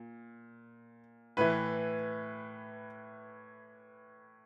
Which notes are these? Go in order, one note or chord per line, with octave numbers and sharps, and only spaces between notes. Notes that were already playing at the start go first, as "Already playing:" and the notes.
Already playing: A#2
A2 E3 B4